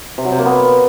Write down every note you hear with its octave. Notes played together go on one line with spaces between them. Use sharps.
C3
F#3
C3
A#3
B3